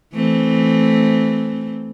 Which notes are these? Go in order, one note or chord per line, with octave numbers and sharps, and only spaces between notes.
E3 A3 C4